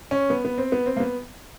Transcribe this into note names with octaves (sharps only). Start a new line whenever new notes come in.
C#4
B3
B3
C4
B3
C4
A#3
B3